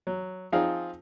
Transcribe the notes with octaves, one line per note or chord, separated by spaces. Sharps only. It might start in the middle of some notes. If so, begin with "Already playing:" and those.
F#3
F3 C4 D#4 F4 G#4